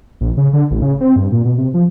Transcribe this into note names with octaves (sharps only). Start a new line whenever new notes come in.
A#1
C#3
D3
A1
C#3
C4
G2
A#2
B2
C3
F3